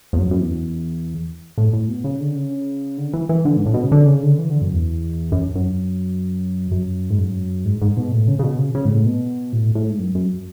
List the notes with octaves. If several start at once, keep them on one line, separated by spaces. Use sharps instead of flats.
E2
F#2
F#2
E2
A2
A2
B2
C#3
D3
C#3
D3
E3
E3
D3
G#2
A2
B2
C#3
D3
C#3
D3
E3
D3
F#2
E2
F#2
F#2
F#2
G#2
F#2
G#2
G#2
B2
A2
C#3
C#3
B2
C#3
C#3
G#2
A2
B2
A2
A2
G#2
F#2
F#2